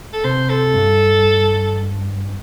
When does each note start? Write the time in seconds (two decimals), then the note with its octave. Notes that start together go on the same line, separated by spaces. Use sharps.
0.13 A4
0.24 C3 C5
0.49 A4
0.74 G2